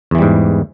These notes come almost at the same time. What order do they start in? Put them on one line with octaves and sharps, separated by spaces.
E2 E3 G3 G#2